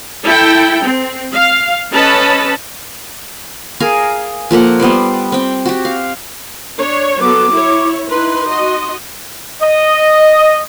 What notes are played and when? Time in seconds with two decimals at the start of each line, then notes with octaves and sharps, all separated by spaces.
0.25 E4 A4 G5
0.83 C4
1.33 F5
1.92 C#4 A4 B4 D#5 A5 B5
3.80 G#4 A#4 F5 G#5
4.51 F3 A#3 A4 F#5
4.80 G3 B3 C5 D5
5.32 C4 G5
5.66 F#4 G4
5.85 F5
6.79 D4 C#5
7.21 F#3 B3 A4 D6
7.54 E4 C#5
8.11 D#4 E4 B4 C6
8.49 F#4 D#5
9.62 D#5